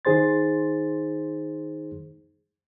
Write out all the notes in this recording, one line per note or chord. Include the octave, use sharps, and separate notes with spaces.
D#3 D#4 G#4 C5 C6 A6